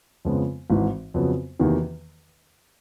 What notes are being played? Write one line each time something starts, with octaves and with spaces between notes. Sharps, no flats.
F2 C#3 F3 G#3 B3
G#1 G#2 E3
F2 C#3 F#3 B3
E2 C3 D#3 F#3 A#3